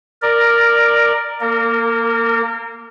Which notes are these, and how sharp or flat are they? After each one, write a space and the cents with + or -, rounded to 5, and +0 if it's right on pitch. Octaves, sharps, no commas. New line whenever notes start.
A#4 +0 D5 +10
A#3 +0 A#4 -35